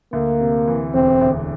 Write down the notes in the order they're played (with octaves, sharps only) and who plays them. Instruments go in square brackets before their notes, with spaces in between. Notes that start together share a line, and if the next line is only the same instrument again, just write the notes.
[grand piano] D2 [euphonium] A#3
[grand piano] C3
E3
[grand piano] E1 [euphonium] C4
[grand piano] D2